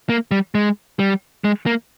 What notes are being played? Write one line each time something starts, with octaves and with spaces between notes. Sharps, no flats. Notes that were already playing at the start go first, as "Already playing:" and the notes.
A#3
G3
G#3
G3
G#3
A#3